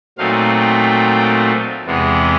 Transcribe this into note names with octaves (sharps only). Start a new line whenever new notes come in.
A#2 F#3 A3 C4 D#4 F5
G5
E2 C3 E3 G#3 B3